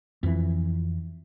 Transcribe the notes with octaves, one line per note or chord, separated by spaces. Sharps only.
F2 E3